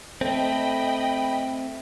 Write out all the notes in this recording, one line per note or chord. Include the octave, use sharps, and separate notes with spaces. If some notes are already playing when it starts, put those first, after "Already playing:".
A3 C4 D#5 G5 B5